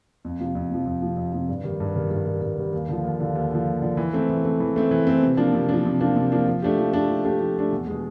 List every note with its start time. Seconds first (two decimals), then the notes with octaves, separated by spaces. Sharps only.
0.25 F2
0.40 C3 F3
0.55 F2
0.70 C3 F3
0.86 F2
1.02 C3 F3
1.17 F2
1.33 C3 F3
1.49 G2
1.64 D#3 G3
1.80 G2
1.96 D#3 G3
2.11 G2
2.26 D#3 G3
2.42 G2
2.58 D#3 G3
2.73 D#2
2.88 D3 F3
3.05 D#2
3.20 D3 F3
3.35 D#2
3.51 D3 F3
3.67 D#2
3.82 D3 F3
3.97 E3
4.13 A3 C4
4.30 E3
4.45 A3 C4
4.60 E3
4.76 A3 C4
4.91 E3
5.07 A3 C4
5.23 C3
5.37 F3 A#3 D4
5.53 C3
5.69 F3 A#3 D4
5.85 C3
6.01 F3 A#3 D4
6.16 C3
6.32 F3 A#3 D4
6.48 F3
6.62 A3 D4 G4
6.78 F3
6.93 A3 D4 G4
7.09 F3
7.25 A3 D4 G4
7.40 F3
7.56 A3 D4 G4
7.72 E2
7.87 B2 G#3